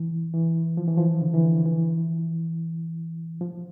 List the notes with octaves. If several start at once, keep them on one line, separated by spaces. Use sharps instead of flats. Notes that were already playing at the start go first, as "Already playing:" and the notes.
Already playing: E3
E3
F3
E3
F3
D3
E3
D3
E3
F3